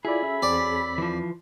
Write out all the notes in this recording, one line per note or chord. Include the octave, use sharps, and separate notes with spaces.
F#3 E4 F4 G#4 A4 D5 B5
C#4 E5
E2 C4 D5
E3 F3